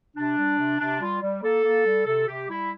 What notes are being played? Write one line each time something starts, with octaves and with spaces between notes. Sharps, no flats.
C3 D4
G3
C3
C3 D4
G3 F4
G3
A#3 A4
A#3
G3
C3 A4
C3 G4
G3 E4